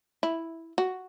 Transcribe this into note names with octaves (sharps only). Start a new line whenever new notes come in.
E4
F#4